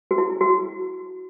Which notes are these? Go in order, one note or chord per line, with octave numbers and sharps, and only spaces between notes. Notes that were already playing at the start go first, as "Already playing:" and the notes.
F#4
E4
F#4